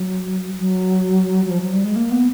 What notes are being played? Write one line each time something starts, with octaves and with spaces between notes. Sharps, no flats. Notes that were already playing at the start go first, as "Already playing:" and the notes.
Already playing: F#3
F#3
F#3
F3
F#3
G3
G#3
A#3
B3